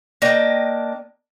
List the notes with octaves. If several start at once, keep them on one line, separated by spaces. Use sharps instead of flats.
A#3 D4 D#5 G5